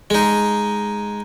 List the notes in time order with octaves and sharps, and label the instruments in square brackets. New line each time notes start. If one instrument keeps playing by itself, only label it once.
[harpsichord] G#3 D#4